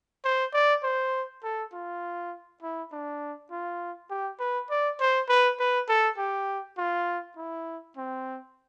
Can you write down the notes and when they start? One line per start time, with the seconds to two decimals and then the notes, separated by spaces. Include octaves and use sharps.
0.24 C5
0.54 D5
0.83 C5
1.44 A4
1.73 F4
2.62 E4
2.92 D4
3.51 F4
4.10 G4
4.40 B4
4.70 D5
5.00 C5
5.29 B4
5.60 B4
5.89 A4
6.18 G4
6.78 F4
7.37 E4
7.97 C4